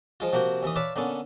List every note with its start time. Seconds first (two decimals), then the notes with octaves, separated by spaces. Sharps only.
0.20 F3 G#3 F4
0.33 C3 F3 A#3 F#4 G5
0.63 D#2 E3 D#6
0.76 B4 C#5 D5 E5 F5 A5
0.96 D3 A#3 B3 C#4 A4